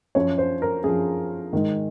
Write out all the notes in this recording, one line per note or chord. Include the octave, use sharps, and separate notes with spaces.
F#2 F3 C#5
C5
A#4
F#2 F3 G#4
G#2 D#3